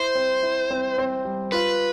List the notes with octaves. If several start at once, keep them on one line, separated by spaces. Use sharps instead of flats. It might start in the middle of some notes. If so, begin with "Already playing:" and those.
Already playing: E4 C5
C4
E4
C4
C4
G3
F4 B4